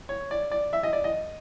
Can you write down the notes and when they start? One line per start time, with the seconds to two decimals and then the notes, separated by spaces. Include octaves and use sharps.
0.09 C#5
0.31 D5
0.51 D5
0.73 E5
0.83 D#5
0.93 D5
1.04 D#5